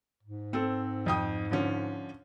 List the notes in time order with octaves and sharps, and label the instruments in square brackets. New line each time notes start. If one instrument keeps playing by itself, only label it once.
[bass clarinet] G#2
[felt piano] C4 A4
F2 G5 D#6
D3 F3 C#4